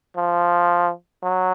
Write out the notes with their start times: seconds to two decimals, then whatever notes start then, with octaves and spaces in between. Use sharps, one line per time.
0.17 F3
1.23 F#3